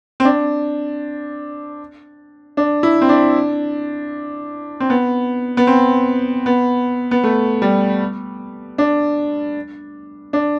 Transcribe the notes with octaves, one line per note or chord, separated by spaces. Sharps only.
C4
D4
D4
E4
C4
D4
C4
B3
B3
C4
B3
B3
A3
G3
D4
D4